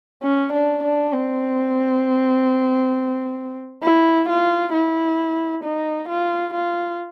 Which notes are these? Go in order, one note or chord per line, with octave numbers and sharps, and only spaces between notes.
C#4
D4
D4
C4
E4
F4
E4
D#4
F4
F4